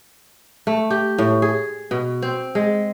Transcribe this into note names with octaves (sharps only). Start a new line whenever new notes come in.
A3
G4
A2
G#4
B2
C4
G#3